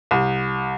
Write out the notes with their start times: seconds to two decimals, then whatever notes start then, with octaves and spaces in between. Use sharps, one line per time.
0.11 C2